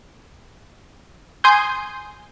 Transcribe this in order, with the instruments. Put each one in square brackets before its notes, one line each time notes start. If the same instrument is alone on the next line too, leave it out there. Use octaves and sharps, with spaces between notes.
[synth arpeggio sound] G#5 C6 D#6 G6